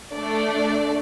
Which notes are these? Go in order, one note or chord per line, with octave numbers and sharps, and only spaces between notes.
A3 D4 D5